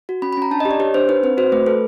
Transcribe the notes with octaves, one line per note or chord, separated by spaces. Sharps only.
F#4
C#4 B5
B5
C#4 A#5
D4 A5
D#5
G4
D5
G4 C#5
D4 C5
D#4 B4
C4 B4
F#4 C5
A3 B4
A4 B4